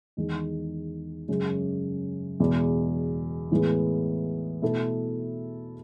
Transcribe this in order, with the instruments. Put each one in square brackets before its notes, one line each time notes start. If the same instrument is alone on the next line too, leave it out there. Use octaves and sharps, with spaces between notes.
[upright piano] E2 D#3 G#3 D#4
F#2 C#3 G#3 C#4
E2 B2 G#3
A2 E3 G#3 B3
B2 A3 E4 A4